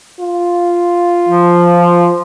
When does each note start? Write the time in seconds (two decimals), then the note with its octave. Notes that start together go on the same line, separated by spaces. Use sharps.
0.20 F4
1.29 F3